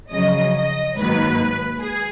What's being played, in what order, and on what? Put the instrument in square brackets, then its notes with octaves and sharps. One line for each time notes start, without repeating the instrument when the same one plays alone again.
[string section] F2 C#3 F#3 D#5
D#5
G#2 D#3 F#3 A#3 B4
G#4